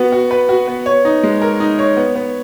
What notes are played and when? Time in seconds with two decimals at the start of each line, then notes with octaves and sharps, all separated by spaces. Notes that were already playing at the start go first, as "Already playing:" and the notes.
Already playing: B3 F#4
0.12 F#4
0.31 B4
0.49 F#4
0.68 B3
0.86 C#5
1.05 D#4
1.23 G#3
1.42 A#4
1.60 D#4
1.79 C#5
1.97 B3
2.16 B3